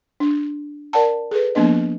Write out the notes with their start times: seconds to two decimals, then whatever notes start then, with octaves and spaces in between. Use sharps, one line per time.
0.20 D4
0.93 A#4 D5 F#5 A5
1.31 G#4 A4 B4
1.55 F3 A#3 B3 D4 D#5